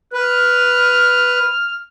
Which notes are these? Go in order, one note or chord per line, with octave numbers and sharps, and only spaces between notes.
B4 F6